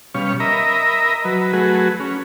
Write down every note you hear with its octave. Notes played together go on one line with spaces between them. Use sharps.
B2 G3 C#4 C#5 F5
A#4 D#5 E5 A#5 B5
F#3 B4
F#3 A3 F#4 G#4 B4
C#4